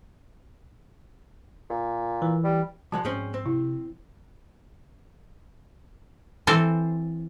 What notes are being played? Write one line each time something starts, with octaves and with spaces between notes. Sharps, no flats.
A#2
E3
G3
C2 F3 G#3 F#4 F#5 A5
G#2 C4 C#4 G#4
C4
C3 E4
E3 C4 A4 C5